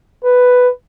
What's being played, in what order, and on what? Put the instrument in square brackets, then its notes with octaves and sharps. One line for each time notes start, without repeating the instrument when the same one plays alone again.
[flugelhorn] B4